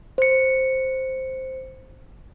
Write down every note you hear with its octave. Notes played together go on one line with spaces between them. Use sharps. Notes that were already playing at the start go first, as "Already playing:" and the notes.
C5 C#7